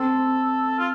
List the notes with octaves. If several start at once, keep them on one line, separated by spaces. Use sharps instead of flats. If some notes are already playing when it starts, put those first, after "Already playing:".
Already playing: C4 A4
F4